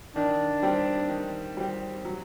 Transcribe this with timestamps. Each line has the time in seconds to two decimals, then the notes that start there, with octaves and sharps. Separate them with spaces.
0.15 D#3 D4
0.62 G3 C4 G4
1.10 D#3
1.57 G3 C4 G4
2.05 F#3